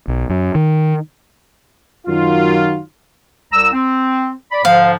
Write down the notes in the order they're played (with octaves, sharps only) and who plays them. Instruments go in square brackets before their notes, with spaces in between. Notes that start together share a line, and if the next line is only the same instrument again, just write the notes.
[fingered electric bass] B1
F#2
D#3
[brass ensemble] F#2 D#3 F#3 D#4 F4
[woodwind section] C2 A#5 E6
C4
D5 B5
[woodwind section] G#2 D3 F3 [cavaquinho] F5